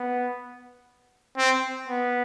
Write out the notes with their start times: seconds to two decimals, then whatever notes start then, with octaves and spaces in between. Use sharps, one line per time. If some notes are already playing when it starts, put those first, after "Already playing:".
Already playing: B3
1.37 C4
1.88 B3